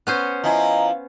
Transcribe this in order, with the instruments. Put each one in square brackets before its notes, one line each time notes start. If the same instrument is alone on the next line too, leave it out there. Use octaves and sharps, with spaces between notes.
[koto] B3 C#4 C5
[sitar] F3 E4 [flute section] D#5 G#5 A#5